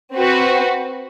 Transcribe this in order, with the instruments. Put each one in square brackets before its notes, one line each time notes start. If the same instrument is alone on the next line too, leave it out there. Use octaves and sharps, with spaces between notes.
[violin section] C4 F#4 B4